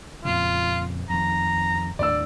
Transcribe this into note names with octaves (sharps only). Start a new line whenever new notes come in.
F2 A#2 C#3 F4
F2 D#3 A#5
D#2 A2 D4 D5 E6